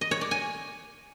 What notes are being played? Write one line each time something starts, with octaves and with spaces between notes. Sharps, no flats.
D#5
C#5
D5
G#5